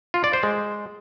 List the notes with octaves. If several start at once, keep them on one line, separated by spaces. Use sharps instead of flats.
F4
D5
C5
G#3